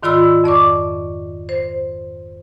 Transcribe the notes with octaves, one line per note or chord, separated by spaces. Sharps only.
G#2 D#3 F4 D5 B5 E6
F2 D5 C#6 D6
C5